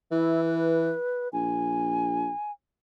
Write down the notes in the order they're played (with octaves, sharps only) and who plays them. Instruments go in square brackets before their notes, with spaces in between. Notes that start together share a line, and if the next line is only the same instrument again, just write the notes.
[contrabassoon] E3 [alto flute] E4
[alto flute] B4
[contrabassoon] A#1 [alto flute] G#5